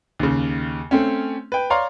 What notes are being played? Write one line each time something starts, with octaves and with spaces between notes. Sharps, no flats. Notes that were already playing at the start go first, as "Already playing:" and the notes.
D#2 C#3
A3 C4 C#4
B4 G5
C#5 D5 F5 A#5 C6